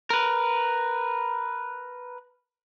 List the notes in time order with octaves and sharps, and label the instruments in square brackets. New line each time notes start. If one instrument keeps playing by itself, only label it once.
[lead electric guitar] A#4 B4